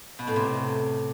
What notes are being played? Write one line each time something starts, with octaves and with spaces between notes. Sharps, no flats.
B2
A2
C3